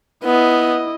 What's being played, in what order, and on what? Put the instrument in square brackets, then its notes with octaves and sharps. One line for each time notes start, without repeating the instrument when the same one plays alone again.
[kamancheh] B3 [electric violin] E4 D#5